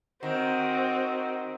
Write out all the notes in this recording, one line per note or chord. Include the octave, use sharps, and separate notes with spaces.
D#3 C4 F#4